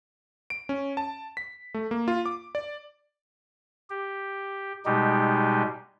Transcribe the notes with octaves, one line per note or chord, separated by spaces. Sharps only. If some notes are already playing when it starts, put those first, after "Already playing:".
D7
C#4
A5
B6
A3
A#3
F4
D6
D5
G4
B2 G3 G#3 D#4 G4